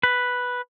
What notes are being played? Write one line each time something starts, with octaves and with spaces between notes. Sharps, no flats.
B4